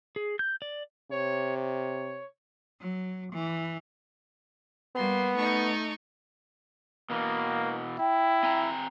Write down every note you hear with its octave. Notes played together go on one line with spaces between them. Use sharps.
G#4
G6
D5
C3 C#5
C#5
F#3
E3
G3 A#3 B3 C6
A3 D#4 C#6
B2 E3 A#3
E4 G5
C4 G#5 A#5